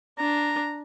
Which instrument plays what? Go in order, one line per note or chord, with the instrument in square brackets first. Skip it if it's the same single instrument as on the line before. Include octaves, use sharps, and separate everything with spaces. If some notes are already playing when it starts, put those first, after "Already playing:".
[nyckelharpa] D4 [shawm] A#5